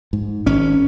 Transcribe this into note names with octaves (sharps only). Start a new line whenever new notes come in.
G#2
G#1 C#4